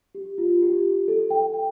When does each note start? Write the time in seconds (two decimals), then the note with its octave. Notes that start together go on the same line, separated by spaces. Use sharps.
0.15 G4
0.38 F4
0.62 G4
1.08 A4
1.30 G5
1.54 G5